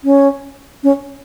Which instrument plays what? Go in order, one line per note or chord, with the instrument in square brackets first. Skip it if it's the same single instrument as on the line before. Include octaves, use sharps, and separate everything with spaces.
[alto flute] C#4
C#4